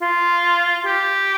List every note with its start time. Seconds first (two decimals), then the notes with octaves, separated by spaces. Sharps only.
0.01 F4
0.85 G4